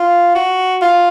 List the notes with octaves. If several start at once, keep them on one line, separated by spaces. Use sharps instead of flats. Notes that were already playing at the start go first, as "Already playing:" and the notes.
Already playing: F4
F#4
F4